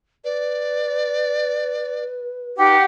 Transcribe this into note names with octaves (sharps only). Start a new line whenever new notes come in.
B4 D5
D#4 G4 F#5